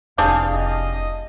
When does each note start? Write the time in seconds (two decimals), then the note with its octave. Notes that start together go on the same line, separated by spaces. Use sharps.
0.18 F1 D4 E4 G4 G#4 F5
0.55 D#5